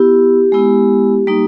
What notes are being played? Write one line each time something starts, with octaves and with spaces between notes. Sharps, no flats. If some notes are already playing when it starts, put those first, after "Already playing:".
Already playing: B3 E4 G4
G#3 B3 E4
G3 A#3 D#4